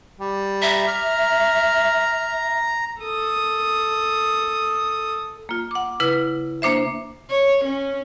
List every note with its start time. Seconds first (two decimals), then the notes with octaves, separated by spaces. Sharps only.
0.20 G3
0.62 E5 A#5
0.88 F6
3.02 A4 D#6
5.49 A#3 F4
5.71 F#5 D6
6.00 C#3 E4 B4
6.62 A#3 D4 C5 E5
7.30 C#5
7.64 C#4